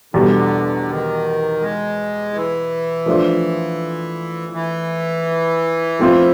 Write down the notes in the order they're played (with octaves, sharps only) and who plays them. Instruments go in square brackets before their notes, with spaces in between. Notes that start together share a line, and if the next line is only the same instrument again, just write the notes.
[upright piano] E2 B2 G3 [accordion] D3
[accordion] D#3
G#3
E3
[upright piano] F3 A3 D4 F4
[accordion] E3
[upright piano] F3 A3 C4 F4